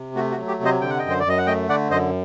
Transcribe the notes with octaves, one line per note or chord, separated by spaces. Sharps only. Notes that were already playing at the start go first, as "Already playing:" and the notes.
Already playing: C3
A3 F#4
F#4
F#3
G4
C3
C5 D#5
D3 G5
F#5
F#2 D#5 G5
C5
D5
F#2 D#5
F#5
A3 D#5 G5
D3 D5 F#5
F#2 C5 D#5